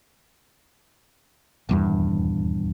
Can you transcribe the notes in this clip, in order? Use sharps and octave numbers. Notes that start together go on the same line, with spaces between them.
D#1 E2 G2